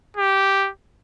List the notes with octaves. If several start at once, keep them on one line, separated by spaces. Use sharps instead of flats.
G4